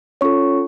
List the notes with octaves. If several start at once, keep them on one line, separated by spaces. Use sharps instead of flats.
C#4 F4 A4 C#5 C#6